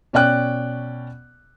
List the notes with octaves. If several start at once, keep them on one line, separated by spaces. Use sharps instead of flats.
B2 C#4 D5 G5 F#6